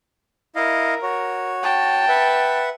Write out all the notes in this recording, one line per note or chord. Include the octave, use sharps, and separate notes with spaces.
E4 A#4 D#5 F5
F#4 C#5
G5 A5
B4 E5 F#5